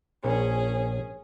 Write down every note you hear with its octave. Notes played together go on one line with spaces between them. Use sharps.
A#1 C#4 G#4 A#4 C5